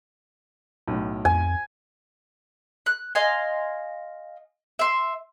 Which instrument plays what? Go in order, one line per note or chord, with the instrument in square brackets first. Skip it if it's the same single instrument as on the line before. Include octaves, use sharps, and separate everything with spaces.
[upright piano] B1 A2
[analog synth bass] F2 [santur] G#5
[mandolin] F#6
D#5 F5 G#5 C6
E5 C6